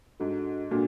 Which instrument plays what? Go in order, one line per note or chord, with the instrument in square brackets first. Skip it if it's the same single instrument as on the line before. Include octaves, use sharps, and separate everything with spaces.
[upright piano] G#2 [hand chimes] D4 F#4 A4
[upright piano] A#2 [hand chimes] D4 F#4 A4